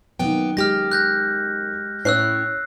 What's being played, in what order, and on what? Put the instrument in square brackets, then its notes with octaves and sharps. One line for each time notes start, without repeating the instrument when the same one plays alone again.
[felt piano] F#2 D#3 [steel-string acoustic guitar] A#3 B3 G5
[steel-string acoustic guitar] G#3 G4 [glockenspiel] F6 A#6
[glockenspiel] F#6 G6 A#6
[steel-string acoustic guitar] A2 C#4 E4 [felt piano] C#5 [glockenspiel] E6 F#6 C7